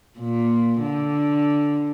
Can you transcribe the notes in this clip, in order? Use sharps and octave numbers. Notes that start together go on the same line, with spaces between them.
A#2
D3